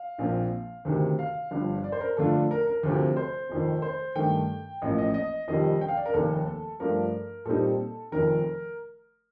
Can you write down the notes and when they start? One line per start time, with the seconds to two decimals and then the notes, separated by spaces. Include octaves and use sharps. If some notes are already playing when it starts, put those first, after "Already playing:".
Already playing: F5
0.18 A#1 A#2 F3 C4 F4
0.85 D2 C3 D#3
1.19 F5
1.51 G1 G2 F3
1.84 D5
1.92 C5
2.01 A#4
2.17 F2 D3 A3 D4 F4 A4
2.51 A#4
2.67 A#4
2.83 D2 C3 F3 A3 C4
3.17 C5
3.50 F1 F2 D#3
3.82 C5
4.15 G2 D#3 A3 G5
4.82 A1 A2 F3 A#3 D#5
4.98 D#5
5.14 D#5
5.48 F1 F2 D#3 G3 D#5
5.81 G5
5.88 F5
5.97 D5
6.06 A#4
6.14 F1 D#2 D#3 A#3 A4
6.80 G2 F3 A3 D4 F4 A#4
7.45 A#2 G3 C4 D#4 A4
8.12 F1 F2 D#3 A#4